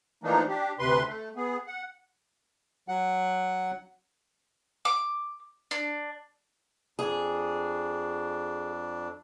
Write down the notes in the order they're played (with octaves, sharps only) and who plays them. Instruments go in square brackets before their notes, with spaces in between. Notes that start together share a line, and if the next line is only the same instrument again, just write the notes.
[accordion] E3 F3 A3 A#3 D4 D#4
D4 G4
D2 C3 B4 C6
A3
B3 G#4
F#5
[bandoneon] F#3 F#5
[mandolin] D6
D4
[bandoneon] F2 D4 [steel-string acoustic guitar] G#4